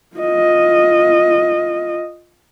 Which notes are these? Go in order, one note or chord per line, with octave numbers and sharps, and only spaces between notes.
F4 D#5